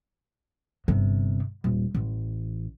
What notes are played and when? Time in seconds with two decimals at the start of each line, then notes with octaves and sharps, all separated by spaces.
0.88 G1 C3
1.64 D#1
1.95 A1